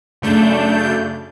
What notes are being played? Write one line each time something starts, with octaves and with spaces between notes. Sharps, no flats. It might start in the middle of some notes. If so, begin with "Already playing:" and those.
F#2 C#3 A3 D4 G6